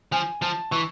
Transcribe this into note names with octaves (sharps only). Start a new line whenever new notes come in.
F3 G#5
F3 A5
E3 C#6